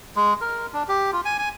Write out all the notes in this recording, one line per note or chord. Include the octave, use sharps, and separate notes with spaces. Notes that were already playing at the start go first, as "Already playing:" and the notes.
G#3
A#4
D4
G4
F4
G#5
G#5